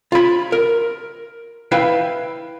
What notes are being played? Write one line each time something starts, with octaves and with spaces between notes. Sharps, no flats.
F4 B5
A#4
E4 B4 F5 G5